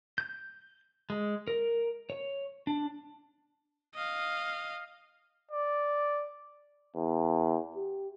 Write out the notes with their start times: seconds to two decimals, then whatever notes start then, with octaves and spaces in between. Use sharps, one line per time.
0.18 G6
1.10 G#3
1.48 A#4
2.10 C#5
2.67 D4
3.95 D#5 F5
5.51 D5
6.96 E2
7.76 G4